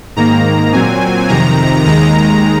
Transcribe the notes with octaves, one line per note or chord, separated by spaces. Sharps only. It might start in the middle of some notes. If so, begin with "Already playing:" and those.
G#2 D#3 A#3 A#5
A#2 F#3 C4 G#5
F2 C3 D#3 A#5
D#2 D#3 G#3 A#5